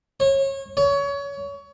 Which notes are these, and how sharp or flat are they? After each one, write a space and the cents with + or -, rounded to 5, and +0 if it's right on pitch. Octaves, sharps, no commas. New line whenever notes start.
C#5 -30
C#5 +25